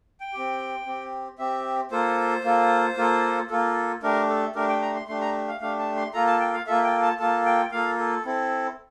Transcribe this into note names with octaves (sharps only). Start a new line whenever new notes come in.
G5
C4 G4
C4 G4
C4 G4 E5
A#3 F4 A4 C5
A#3 F4 A4
A#3 F4 A4
A#3 F4 A4
A3 D4 G4 A#4
A4
A3 D4 G4 A#4
G5
A#5
C6
A3 D4 G4 C6
A#5
F5
A3 D4 G4 F5
A5
C6
A#3 F4 A4 A#5
A5
G5
F5
A#3 F4 A4 E5
G5
A5
A#3 F4 A4 A5
G5
A#3 F4 A4 F5
A4
C4 E4 A4